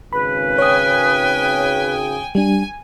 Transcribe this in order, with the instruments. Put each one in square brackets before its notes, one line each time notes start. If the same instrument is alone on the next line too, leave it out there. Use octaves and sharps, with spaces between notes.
[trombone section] G#1 C#3 [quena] B4 [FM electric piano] B5
[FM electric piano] C#5 D#6 [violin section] G5 G#5
[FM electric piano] G3 D4 [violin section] G#5